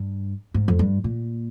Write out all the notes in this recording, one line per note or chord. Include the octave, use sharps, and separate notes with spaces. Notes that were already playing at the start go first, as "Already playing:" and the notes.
Already playing: G2
G#2
F2
G2
A#2